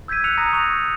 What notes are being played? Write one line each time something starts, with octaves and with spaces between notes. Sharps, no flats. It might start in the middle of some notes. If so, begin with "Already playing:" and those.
E6 G6 G#6 B6 D#7
E6 F#6 C#7 F7
A#5 D#6 G6 A#6
C#6 A6 F7